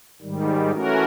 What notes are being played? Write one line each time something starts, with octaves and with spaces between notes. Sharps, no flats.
G#2 D#3 G3
E3 A3 C#4 F#4 A#4